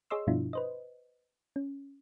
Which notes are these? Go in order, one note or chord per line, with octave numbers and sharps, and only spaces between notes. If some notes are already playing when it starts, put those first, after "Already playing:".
G#4 C#5 D#5 C6 E6
G2 B2 F3 D4 E4 F4
B4 C5 D#5
C#4